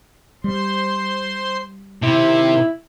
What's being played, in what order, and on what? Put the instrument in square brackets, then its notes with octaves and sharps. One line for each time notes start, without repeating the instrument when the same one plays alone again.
[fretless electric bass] G3 [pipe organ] C5 C6
[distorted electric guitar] C3 [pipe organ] D#3 [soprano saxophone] E4